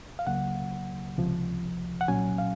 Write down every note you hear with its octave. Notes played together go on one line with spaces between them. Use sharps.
F5
C#2 C#3 F#3 A#3 F#5
C#2 C3 F3
F#5
C2 A#2 F#3 C#4 G#5
F5